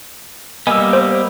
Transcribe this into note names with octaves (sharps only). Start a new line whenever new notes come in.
G3 A#3 B3 D#5 G#5 E6
C5